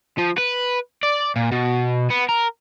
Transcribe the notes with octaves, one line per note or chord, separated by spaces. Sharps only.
F3
B4
D5
A#2
B2
B3
A#4